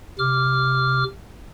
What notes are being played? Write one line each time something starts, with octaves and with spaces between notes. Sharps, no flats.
C3 D6 F6